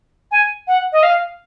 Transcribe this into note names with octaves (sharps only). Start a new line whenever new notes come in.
G#5
F#5
D#5
F5